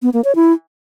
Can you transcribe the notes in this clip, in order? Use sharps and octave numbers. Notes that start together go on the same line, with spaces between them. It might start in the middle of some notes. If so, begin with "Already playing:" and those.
B3
A#3
C#5
E4